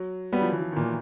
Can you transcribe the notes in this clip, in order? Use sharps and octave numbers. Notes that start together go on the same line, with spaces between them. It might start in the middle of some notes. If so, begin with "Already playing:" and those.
Already playing: F#3
F#3 G3 B3
F3
E3
F3
D#3
A#2 E3